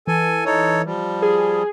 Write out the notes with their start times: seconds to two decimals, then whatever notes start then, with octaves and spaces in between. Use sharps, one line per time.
0.07 E3 A4 G#5
0.46 D#4 A4 C#5
0.85 F3 G3
1.22 G#4